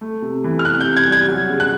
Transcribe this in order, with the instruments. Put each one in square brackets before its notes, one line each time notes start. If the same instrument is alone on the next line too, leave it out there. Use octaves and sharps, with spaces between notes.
[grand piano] A3
C3
E3
F6
C3 F#6
G6
C3
G#6
G3
G#6
F#3
C#3
F#6